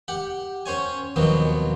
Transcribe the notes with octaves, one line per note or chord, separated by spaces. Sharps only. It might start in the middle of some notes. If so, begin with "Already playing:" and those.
G4 F#5
C#4 C5 C#5 G#5
D#2 B2 F3 F#3 B3 C4